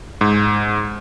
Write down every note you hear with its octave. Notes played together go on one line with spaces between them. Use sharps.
G#2